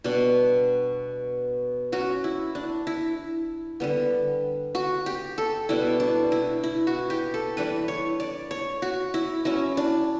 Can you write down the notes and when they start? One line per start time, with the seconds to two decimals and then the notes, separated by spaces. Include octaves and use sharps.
0.04 B2 G3 D4
1.92 F#3 C#4 F#4
2.24 E4
2.55 D4
2.87 E4
3.80 D3 G3 B3
4.75 F#4
5.06 G4
5.38 A4
5.69 B2 G3 D4 E4
6.00 D4
6.32 E4
6.64 E4
6.87 F#4
7.10 G4
7.34 A4
7.57 E3 G3 D4 B4
7.88 C#5
8.20 D5
8.51 C#5
8.82 F#4
9.14 E4
9.45 F#3 C#4 E4
9.77 D4